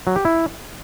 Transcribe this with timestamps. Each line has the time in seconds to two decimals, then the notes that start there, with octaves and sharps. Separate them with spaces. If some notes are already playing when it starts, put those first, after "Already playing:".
0.07 F#3
0.16 G4
0.25 E4